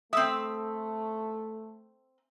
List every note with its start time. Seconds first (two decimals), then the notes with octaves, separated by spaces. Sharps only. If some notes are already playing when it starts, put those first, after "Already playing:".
0.13 A3 C4 E5 D#6